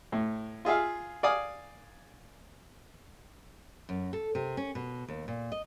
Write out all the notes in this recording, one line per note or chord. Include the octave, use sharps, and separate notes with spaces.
A2
F4 G#4 E5 F5
D5 F5 G#5 D#6
F#2
A4
C3
C#4
B2
D#2
A#2
D#5